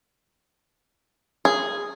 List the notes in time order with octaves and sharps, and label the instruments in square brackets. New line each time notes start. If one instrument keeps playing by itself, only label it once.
[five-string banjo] G#4